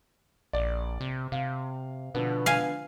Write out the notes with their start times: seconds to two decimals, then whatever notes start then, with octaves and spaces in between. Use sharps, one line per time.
0.53 A#1 D5
1.01 C3
1.32 C3 F5
2.15 B2 D3 F3 B3
2.46 F5 G#5